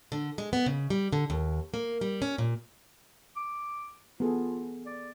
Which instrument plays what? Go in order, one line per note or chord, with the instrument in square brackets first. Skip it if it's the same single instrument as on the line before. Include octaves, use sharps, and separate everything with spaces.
[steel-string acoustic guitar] D3
G#3
B3
C#3
G3
D3
D#2
A#3
G3
C#4
A#2
[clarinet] D6
[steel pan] B3 G#4 A4 [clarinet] F4
[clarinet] D5